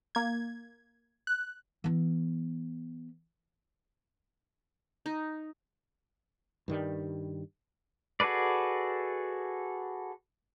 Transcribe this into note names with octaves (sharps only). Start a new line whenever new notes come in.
A#3 G#6
F#6
E3 B3
D#4
G2 D#3 G3
F#4 G#4 A4 B4 D5